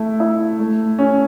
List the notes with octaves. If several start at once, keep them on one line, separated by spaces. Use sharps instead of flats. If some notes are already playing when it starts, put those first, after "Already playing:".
Already playing: A3 E4
E4
A3
C#4